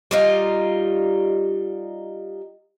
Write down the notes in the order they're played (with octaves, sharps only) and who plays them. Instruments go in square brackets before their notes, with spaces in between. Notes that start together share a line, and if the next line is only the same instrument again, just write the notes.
[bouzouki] G3 D#4 F4